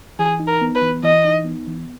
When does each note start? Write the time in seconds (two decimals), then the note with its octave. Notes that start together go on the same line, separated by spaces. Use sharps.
0.19 E3 G#4
0.40 D#4
0.48 A#4
0.61 B3
0.75 B4
0.82 E3
1.03 E3 D#5
1.25 D#4
1.45 B3
1.67 E3